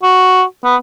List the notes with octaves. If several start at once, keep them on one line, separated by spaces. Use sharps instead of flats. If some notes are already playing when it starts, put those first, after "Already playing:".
F#4
B3